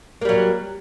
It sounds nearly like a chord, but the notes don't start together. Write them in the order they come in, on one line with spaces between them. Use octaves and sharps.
A#3 G3 F#3